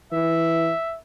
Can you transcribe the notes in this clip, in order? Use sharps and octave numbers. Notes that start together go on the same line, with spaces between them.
E3 E5